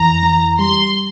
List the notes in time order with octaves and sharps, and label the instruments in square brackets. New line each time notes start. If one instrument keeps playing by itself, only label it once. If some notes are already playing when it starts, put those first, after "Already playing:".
Already playing: [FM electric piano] F2 E3 [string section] A#5
[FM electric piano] E3
[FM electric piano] G3 [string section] C6